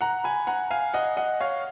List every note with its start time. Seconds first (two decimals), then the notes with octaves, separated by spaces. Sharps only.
0.01 F#5 A#5
0.24 G#5 B5
0.47 F#5 A#5
0.71 F5 G#5
0.94 D#5 F#5
1.17 D#5 F#5
1.41 C#5 F5